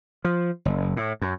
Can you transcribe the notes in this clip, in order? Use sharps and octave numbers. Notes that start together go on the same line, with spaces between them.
F3
F#1
A2
F#2